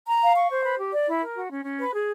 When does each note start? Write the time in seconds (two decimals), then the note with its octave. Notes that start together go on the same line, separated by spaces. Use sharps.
0.06 A#5
0.21 F5
0.35 C#6
0.49 C5
0.64 B4
0.78 G4
0.93 D5
1.07 E4
1.22 A#4
1.36 F#4
1.50 C#4
1.65 C#4
1.79 B4
1.94 G#4